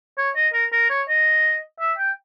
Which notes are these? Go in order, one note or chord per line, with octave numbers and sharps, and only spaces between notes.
C#5
D#5
A#4
A#4
C#5
D#5
E5
G5